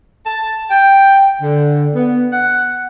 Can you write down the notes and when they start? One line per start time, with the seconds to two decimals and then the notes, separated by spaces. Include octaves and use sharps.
0.26 A5
0.71 G5
1.41 D3
1.95 B3
2.32 F#5